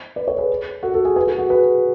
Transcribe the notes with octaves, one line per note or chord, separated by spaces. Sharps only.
B4 D5
A4 C#5
G#4 B4
F#4 A4
F#4 A4
G#4
G#4 B4
F#4 A4
F#4
G#4 B4